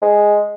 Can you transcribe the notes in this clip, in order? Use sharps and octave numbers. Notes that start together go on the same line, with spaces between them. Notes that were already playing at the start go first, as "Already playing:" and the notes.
G#3